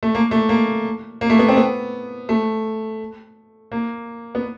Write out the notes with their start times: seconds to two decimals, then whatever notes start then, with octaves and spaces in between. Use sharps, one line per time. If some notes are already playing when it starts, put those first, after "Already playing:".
0.03 A3
0.15 A#3
0.31 A3
0.49 A#3
1.21 A#3
1.30 A3
1.39 B3
1.49 C4
1.57 B3
2.29 A3
3.72 A#3
4.35 B3